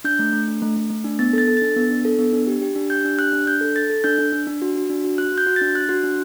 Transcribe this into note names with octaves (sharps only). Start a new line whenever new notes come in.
D4 G6
A3
A3
D4
A3
A3
A3
D4
B3 A6
A4 A6
A4
D4 A6
B3
D4
A4
B3
D4
G4
G4
D4
G4 G6
D4
G4 F#6
D4
D4 G6
A4
A4 A6
A4
D4 G6
D4
D4
D4
F#4
F#4
D4
F#4
F#4 F#6
F#4
G6
F#4
A6
D4
D4 F#6
F#4
D4